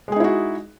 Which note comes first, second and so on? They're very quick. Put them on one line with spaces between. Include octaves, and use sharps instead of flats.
G#3 G#4 D#4 E4 F#4